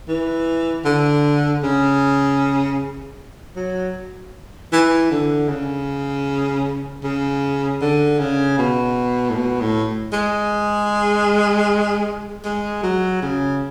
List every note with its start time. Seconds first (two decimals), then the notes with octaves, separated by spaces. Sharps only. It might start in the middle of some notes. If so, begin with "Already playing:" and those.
0.08 E3
0.85 D3
1.63 C#3
3.56 F#3
4.72 E3
5.11 D3
5.48 C#3
7.03 C#3
7.81 D3
8.19 C#3
8.58 B2
9.29 A2
9.35 B2
9.60 A2
10.13 G#3
12.45 G#3
12.83 F#3
13.22 C#3